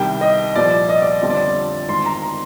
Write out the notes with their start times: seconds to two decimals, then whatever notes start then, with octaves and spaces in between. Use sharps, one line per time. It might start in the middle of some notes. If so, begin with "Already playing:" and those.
Already playing: C2 C3 D#3 G3 G5
0.21 D#5
0.55 C2 A#2 F3 D5
0.89 D#5
1.02 D5
1.22 G1 F2 D3 G3 C4
1.30 D5
1.88 G#1 G#2 D#3 C6
2.06 A#5
2.22 A#5